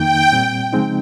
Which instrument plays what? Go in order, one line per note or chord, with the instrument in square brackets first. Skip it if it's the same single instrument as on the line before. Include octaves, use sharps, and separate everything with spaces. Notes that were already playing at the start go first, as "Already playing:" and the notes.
Already playing: [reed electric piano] F2 D#3 A#3 D#4 [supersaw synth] G5
[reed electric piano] A#2 G3 C4
C#3 F3 G#3 C4 D#4